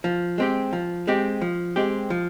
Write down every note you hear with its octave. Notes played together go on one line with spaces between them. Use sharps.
F3
G#3 C4 G4
F3
G#3 C4 G4
F3
G#3 C4 G4
F3